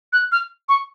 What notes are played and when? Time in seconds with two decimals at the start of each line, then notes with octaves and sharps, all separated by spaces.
0.13 F#6
0.32 F6
0.69 C#6